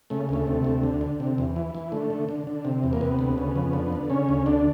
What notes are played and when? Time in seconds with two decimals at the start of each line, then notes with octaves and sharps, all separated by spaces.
0.10 C#3 A3
0.29 D2 A3
0.47 C3
0.64 D2
0.83 D3
1.01 D3
1.20 C3
1.38 E2
1.56 E3
1.75 E3
1.92 D3 A3
2.10 D3
2.29 D3
2.47 D3
2.65 C3
2.83 E2
2.93 A#3
3.01 C3 B3
3.19 D2
3.38 C#3
3.56 F2
3.73 D3
3.92 D3
4.10 C#3 C#4
4.29 D2
4.46 D3 D4